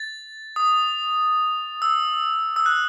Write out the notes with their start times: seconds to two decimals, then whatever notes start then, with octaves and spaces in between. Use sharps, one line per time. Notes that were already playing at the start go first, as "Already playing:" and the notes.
Already playing: A6
0.56 D#6
1.82 E6
2.56 E6
2.66 F#6